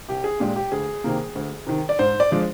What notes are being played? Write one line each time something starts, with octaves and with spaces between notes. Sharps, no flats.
C2 G4
G#4
A#2 G#3 D4 G4
G4
D2 G#4
C3 D#3 A#3
D2
C3 D#3
D5
G#2 C5
D5
F3 G#3 D4